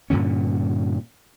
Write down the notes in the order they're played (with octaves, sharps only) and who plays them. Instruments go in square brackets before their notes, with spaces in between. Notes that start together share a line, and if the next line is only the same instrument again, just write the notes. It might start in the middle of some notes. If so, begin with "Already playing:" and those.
[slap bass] G2 A#2 D3 C#4